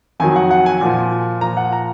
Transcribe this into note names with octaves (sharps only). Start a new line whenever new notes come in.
F2 D#3 F#3 G#5
F#5
F#5
G#5
A#2 F3
A#2 F3 A#5
F#5
A#5